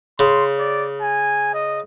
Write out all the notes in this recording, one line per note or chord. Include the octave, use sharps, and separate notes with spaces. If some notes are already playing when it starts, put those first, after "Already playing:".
C#3 C6
D5
G#5
D#5